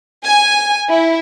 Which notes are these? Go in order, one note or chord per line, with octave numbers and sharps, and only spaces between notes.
G#5
E4